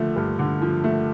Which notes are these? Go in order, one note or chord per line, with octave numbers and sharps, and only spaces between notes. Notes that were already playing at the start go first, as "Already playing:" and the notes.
Already playing: D3 F3 A3
G2
D3
F3
A3